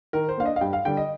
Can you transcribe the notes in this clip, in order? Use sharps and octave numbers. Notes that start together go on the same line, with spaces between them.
D#3 A#4
C5
A#3 D4 F5
D#5
F5
G2 G5
F5
D3 G3 D4 G5
D#5